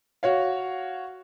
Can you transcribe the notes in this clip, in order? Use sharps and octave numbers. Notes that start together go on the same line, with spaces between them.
F#4 C#5 F5